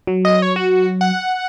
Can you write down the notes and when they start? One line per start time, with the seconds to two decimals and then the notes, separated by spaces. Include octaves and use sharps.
0.07 F#3
0.25 D#5
0.42 C#5
0.56 F#4
1.01 F#5